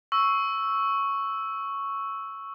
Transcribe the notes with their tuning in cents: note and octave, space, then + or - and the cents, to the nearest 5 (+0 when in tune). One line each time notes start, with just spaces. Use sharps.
C#6 +0 E6 +0